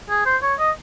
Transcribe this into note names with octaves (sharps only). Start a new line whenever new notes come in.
G#4
C5
C#5
D#5